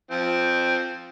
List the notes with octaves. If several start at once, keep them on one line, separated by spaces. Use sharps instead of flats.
F3 C4